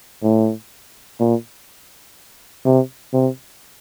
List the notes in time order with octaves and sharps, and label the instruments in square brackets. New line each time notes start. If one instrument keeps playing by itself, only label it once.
[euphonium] A2
A#2
C3
C3